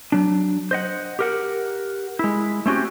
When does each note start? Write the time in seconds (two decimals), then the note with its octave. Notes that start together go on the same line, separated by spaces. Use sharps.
0.12 F#3 D4
0.71 C5 D#5 F#5
1.19 G4 A#4 F#5
2.19 G#3 E4
2.66 A3 C4 C#4 F#4 G4